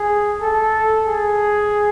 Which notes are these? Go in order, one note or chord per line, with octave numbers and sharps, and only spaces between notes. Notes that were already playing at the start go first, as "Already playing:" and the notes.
Already playing: G#4
A4
G#4